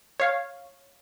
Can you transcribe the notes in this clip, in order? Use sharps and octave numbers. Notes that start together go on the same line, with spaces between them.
C#5 F5